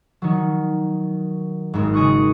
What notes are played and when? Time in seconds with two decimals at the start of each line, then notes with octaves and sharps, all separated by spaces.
0.22 D#3 F#3
1.74 G#1 G#2
1.93 C#3 G#4 D#5 C#6 F#6